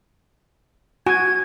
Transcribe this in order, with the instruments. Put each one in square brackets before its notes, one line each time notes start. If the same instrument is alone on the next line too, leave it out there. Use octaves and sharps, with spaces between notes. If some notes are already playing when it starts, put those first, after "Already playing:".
[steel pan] F#4 G#5 [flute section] G#6